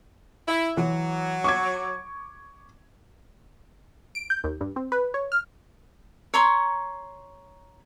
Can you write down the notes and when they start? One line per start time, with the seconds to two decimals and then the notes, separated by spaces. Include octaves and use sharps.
0.48 E4
0.77 E3 F#3
1.44 C#6 D6 G#6
4.15 D7
4.30 G6
4.44 D#2
4.61 G2
4.76 C4
4.92 B4
5.14 C#5
5.32 F6
6.34 C#5 A#5 C6 C#6